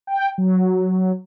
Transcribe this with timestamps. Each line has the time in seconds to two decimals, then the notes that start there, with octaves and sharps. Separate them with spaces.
0.07 G5
0.38 F#3